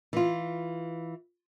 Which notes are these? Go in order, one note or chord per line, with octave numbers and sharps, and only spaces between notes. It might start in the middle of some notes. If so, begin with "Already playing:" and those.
E3 F4